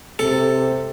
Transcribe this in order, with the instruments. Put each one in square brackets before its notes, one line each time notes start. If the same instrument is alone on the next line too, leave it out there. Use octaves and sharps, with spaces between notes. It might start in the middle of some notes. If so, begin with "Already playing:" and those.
[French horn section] C3 [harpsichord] A4